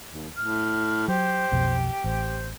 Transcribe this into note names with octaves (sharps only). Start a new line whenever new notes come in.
D#2
A2 F6
F#3 G4 C5
B1 F2 B2
A1 C5